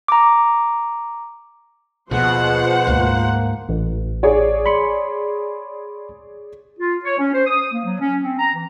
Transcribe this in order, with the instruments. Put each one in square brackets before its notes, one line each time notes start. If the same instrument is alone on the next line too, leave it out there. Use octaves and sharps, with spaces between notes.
[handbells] A#5 D6
[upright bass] D#2 [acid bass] B2 [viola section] F3 C5 F#5 [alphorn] G#4
[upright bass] D2 G#2 [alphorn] A#3
[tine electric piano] A1
[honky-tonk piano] G#4 C#5 D5
[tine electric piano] B5 C6 C#7
[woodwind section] F4
C#5
C#4
C5
D#6
A#3
F#3
C#4
C4
A#5
E3